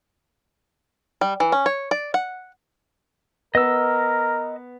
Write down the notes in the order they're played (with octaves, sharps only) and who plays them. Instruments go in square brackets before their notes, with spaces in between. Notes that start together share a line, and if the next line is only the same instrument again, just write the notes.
[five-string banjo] G3
E3
C#4
C#5
D5
F#5
[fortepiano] B3 [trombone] A#4 [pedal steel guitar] D#5 E6